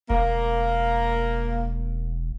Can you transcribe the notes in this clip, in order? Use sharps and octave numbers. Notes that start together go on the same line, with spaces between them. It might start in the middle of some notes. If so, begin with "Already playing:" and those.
E1 A#3